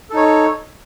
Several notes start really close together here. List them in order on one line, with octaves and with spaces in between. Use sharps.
A4 D#4 C#5